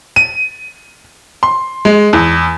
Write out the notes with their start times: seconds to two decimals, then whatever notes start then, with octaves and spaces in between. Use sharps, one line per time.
0.16 D#7
1.43 C6
1.85 G#3
2.13 E2